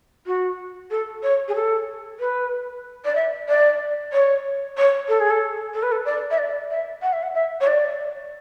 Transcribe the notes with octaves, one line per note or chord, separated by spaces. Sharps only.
F#4
A4
C#5
G#4
A4
B4
D5
E5
D5
C#5
C#5
A4
G#4
A4
A4
B4
A4
D5
E5
D5
E5
F#5
E5
F#5
E5
C#5
D5